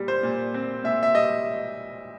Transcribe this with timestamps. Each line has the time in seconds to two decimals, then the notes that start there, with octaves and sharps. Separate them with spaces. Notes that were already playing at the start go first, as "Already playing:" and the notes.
Already playing: A#2 G3
0.08 C5
0.23 A#2
0.54 C4
0.84 A#2 E5
1.03 E5
1.15 G3 D#5